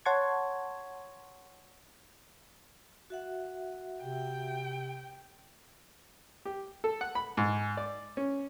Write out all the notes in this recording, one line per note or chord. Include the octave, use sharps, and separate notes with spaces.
C#5 F#5 A5 C6 C#6 G#6
F#4 E5 F#5
C3 G5
G4
A4
F#5
B5
G#2
D5
C#4